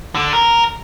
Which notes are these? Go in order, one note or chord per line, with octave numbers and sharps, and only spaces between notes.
D3
A#4